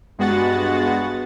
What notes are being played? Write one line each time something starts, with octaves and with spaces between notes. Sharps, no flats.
G2 G#3 B3 F#4 F#5 A6